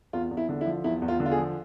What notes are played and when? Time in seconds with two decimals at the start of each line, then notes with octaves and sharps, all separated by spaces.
0.13 E2 F4
0.31 E2
0.37 E4
0.49 D3
0.61 E4
0.66 F3
0.84 E2 E4
1.02 E2
1.08 F4
1.20 D3
1.26 F4
1.32 G#4
1.38 F3